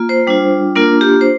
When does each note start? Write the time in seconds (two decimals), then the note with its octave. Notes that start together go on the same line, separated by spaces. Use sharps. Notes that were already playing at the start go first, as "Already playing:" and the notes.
Already playing: A#3 F4
0.09 C5
0.27 G3 D4 F4
0.75 A#3 D4 F4 A#4
1.01 G4
1.21 C5